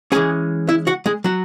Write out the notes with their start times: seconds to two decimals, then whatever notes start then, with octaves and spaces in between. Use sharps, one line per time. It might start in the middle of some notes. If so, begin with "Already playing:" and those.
0.12 E3 G#3 C#4 G#4 G#5
0.69 E4 E5
0.87 F#4 F#5
1.06 G#3 G#4
1.24 F#3 F#4